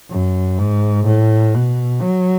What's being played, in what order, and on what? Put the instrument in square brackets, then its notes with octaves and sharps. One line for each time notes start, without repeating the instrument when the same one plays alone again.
[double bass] F#2
G#2
A2
B2
F#3